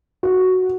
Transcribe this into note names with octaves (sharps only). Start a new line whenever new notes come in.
F#4